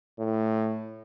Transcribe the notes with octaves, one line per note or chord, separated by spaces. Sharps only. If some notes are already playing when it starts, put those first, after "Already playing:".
A2